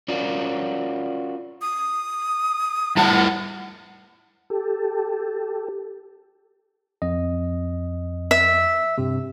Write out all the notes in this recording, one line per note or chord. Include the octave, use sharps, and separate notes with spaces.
C#4 F4 F#4 A#4 D5
D#6
G3 E4 F#5 A5
G4 A4
F2 D#5
E5
G2 C3